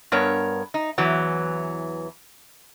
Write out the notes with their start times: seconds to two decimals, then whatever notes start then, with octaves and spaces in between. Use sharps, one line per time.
0.12 G2 B3 A#4 C#5
0.74 D#4
0.98 E2 E3 F#3